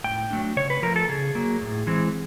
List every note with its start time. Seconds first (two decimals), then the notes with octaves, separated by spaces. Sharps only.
0.04 A2 G5
0.30 F#3 A3 D4
0.56 C#3 C#5
0.70 B4
0.82 F3 A3 A#4
0.96 A4
1.09 C#3 G#4
1.35 F#3 A#3
1.61 A2
1.87 E3 G#3 C4